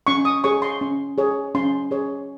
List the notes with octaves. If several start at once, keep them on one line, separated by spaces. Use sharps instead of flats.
C#4 C#6
D#6
G#4 C#5 C#6
C6
C#4
G#4 C#5
C#4 C6
G#4 C#5